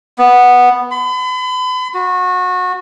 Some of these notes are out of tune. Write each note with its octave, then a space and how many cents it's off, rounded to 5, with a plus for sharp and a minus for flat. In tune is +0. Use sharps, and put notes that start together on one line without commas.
B3 -5
B5 +40
F#4 -25